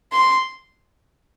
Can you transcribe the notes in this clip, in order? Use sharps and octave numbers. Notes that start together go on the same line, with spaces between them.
C6